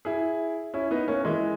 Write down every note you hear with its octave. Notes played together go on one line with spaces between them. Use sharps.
E4 G#4
C#4 E4
B3 D#4
A#3 C#4
E3 G#3